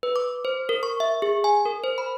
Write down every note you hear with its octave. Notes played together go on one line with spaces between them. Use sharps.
B4
D6
C5
A#4
C#6
E5
G#4
G#5
A#4
C5
B5